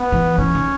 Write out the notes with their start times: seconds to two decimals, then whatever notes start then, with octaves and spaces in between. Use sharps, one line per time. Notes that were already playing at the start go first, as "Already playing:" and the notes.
Already playing: B3
0.12 E3
0.38 E3 C#4
0.55 D#3